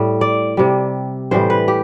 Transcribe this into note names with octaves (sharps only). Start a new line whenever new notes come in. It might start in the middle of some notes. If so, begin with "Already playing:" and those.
Already playing: A2 G3
D5
C3 G3
A2 E3 G3 C5
B4
G4